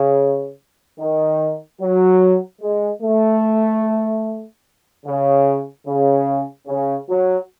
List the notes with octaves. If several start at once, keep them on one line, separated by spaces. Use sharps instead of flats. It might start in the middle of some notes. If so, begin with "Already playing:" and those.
Already playing: C#3
D#3
F#3
G#3
A3
C#3
C#3
C#3
F#3